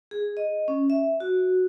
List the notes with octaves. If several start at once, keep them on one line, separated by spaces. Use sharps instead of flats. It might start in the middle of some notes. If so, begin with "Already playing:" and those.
G#4
D#5
C#4
E5
F#4